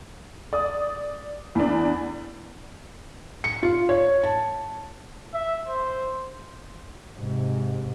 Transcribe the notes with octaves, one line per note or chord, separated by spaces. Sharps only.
D5 D#6
E2 D4
C#7
F4
C#5
A5
E5
C5
G#2 C3